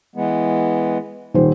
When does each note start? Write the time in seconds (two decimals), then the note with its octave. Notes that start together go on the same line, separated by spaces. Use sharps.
0.16 E3 G#3 B3
1.34 D#1 D#3 C5